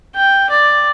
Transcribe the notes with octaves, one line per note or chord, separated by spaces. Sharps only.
G5
D5